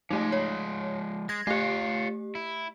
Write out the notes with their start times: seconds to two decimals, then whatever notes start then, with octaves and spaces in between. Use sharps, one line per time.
0.11 F3 G#3 A3 D#4
0.32 C#5
1.29 G#3 G#6 A#6
1.47 A3 F4 G4 C#5
2.35 E4